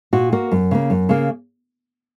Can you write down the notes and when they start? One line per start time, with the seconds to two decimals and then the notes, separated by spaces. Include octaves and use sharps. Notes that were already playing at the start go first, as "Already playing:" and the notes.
0.13 A#2 F#4
0.32 A#3 F#4
0.51 F#2
0.71 C#3 A#3
0.90 F#2
1.09 C#3 A#3